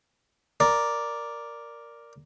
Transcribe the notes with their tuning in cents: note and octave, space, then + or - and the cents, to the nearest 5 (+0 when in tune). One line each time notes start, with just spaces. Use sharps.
A#4 +0 D5 +0